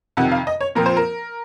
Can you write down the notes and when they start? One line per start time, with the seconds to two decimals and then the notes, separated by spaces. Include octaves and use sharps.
0.17 F2 C3 D#3 F#5
0.32 F5
0.47 D#5
0.61 C#5
0.75 A#2 F3 C4 A#4
0.86 C5
0.97 A#4